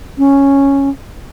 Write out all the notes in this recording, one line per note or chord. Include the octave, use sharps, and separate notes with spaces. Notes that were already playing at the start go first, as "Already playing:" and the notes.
C#4